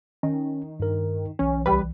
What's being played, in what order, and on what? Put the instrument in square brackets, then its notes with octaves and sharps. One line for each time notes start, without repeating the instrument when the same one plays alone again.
[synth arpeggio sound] D#3 [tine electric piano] C#4
[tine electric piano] G2 A#4
[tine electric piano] B1 E3 [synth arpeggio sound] C#4
[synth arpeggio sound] C#2 G3 B4